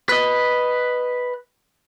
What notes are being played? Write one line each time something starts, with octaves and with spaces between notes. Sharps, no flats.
B4 D#5